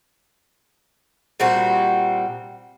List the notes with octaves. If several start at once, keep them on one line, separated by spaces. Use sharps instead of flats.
A#2 G3 C4 F#4